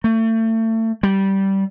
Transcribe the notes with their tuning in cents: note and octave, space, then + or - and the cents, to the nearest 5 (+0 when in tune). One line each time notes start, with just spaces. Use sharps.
A3 +30
G3 -15